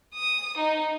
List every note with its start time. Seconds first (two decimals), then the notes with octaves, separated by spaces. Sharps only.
0.14 D#6
0.57 D#4